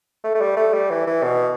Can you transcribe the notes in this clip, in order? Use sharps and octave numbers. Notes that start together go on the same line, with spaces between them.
A3
A3
G3
A3
G3
E3
E3
B2